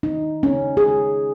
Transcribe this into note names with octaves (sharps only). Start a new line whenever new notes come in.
D#4
C#4
G#4